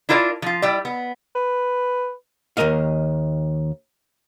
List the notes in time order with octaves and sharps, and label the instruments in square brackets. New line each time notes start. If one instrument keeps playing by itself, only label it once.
[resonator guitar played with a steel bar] D4 E4 F4 A#4 D5
F3 F4
G3 E4 D5
B3
[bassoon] B4
[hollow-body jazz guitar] D#2 D#3 A#4 D#5 F5